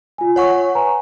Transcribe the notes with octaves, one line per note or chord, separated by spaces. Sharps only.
F4 G#5
C#5 F#5 C#6
B4 G#5 A#5